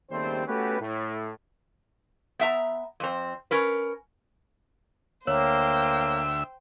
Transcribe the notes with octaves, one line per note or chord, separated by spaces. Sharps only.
D#2 C#3 G3 A3 C4 C5
A3 B3 C#4 F#4 G4 B4
A2
B3 E5 A#5
F2 C4
C#4 A#4 B4
D2 A#3 C5 C#5 E5 G5 E6